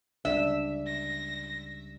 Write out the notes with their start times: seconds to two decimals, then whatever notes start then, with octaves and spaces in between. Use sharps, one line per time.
0.25 C#2 C#3 G3 D4 E5
0.87 A#6